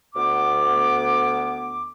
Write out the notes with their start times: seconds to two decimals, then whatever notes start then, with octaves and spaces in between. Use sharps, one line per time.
0.15 D2 B3 D6